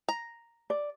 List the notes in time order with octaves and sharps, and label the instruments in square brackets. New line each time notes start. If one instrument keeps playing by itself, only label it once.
[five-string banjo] A#5
[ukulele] D5